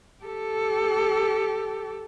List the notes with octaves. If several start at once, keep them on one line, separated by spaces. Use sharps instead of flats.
G4 A4